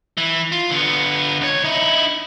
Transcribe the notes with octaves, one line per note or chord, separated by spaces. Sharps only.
E3
F4
D3 B3
C#2 C#5
D#4 E4